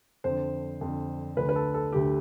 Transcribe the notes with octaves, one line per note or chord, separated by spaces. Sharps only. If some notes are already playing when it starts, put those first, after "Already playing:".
F2 D3 C5
F2 D3
D2 D3 B4
B4
A4
A4
D2 D3 G4